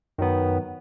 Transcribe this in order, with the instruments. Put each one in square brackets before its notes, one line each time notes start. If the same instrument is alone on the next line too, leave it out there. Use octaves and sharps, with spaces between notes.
[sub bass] F#2 [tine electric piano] D#3 F#3 B3